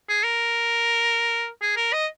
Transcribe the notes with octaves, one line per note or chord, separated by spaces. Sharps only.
G#4
A#4
G#4
A#4
D#5